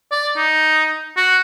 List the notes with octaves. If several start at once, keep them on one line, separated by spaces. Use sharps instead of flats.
D5
D#4
F#4